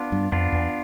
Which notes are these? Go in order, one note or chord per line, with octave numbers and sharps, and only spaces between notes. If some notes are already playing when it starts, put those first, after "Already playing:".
Already playing: B3 D4 F4
G2
F2 B3 D4 F4
E2